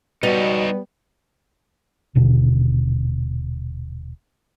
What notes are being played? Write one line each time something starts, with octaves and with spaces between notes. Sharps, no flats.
B2 G3 B3 D#4 C#5
D#1 B2 D3